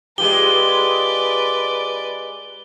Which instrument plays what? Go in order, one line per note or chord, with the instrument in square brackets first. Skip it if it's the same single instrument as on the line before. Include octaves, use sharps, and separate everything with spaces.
[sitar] G#3 F4 G4 [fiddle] B4 D5 [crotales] G7